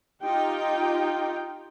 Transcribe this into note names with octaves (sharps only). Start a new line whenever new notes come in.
D#4 F4 G4 G5